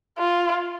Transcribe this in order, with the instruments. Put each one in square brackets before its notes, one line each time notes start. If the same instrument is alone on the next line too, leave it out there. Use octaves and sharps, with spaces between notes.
[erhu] F4